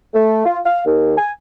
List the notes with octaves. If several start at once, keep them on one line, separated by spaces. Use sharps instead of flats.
A3
F4
F5
D#2
G#5